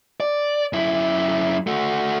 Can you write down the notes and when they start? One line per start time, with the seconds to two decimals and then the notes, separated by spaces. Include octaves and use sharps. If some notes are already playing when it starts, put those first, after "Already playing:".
0.20 D5
0.73 F#2 E4
1.67 A3 F#4